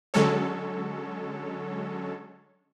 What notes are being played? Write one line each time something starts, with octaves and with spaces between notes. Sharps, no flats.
D3 F#3 G#3 C#4 A4 C#5